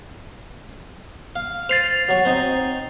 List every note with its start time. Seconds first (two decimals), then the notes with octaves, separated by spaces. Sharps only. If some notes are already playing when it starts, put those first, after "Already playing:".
1.36 F5
1.69 C5 A6 C7 F7
2.09 F#3 C#5
2.25 C4 D#4 G#5